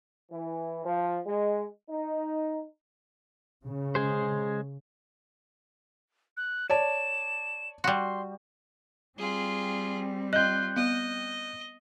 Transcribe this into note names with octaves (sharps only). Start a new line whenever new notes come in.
E3
F3
G#3
D#4
C#3
G#3 G#4 C5
F#6
C#5 D5 A5 E7
G3 F#4 C6
G3 C4 F4 G#4
F4 D#5 F#6 G6
B3 D#5